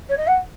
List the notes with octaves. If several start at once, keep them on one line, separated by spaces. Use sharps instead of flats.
C#5
D#5
F#5